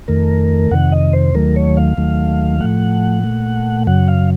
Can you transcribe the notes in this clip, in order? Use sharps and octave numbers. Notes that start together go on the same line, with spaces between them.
F2 D#3 A3 A#4
F2 C3 D#3 F#5
D#5
C5
D#2 D#3 F#3 A3 A#4
C#5
F5
D#2 D#3 F#3 A3
A2 F3 A3 F#5
A#2 A3
F#2 C#3 F#3 F#5
F5